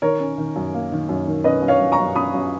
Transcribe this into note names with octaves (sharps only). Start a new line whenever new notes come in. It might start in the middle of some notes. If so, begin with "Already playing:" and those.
D#3 A#4 C#5
C#4
D#3
F#2
A#3
D#3
F#2
D#3
C#4 B4 D#5
F#2
C#5 F5
F#2
A#5 C#6
F#2
C#4 B5 D#6
F#2